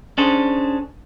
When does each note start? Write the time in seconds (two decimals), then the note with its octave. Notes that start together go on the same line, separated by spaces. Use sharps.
0.18 C#4 D4 G#4 A4 C5